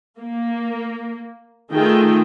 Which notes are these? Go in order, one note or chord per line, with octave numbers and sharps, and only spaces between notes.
A#3
D#3 A3 F4 G#4 G5